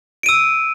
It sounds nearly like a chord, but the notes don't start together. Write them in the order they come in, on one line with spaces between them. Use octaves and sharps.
D7 D#7 E6